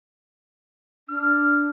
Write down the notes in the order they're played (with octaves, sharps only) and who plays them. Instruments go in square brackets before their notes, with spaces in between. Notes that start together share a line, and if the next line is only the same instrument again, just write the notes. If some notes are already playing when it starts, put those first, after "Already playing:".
[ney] D4 [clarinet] F6